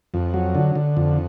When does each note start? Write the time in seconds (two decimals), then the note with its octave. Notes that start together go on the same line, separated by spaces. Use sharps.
0.14 F2
0.34 F#3
0.55 D3
0.75 D3
0.97 F2